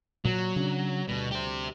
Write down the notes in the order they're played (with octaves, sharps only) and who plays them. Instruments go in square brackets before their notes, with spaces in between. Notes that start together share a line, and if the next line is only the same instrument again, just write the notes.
[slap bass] A#2 [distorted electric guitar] F#3
[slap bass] C#3 D4
[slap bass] D2 G3 [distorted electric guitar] B2
[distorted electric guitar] G4 C5